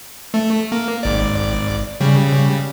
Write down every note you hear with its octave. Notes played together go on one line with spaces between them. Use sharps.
A3
A#3
G#1 D5
C#3 G3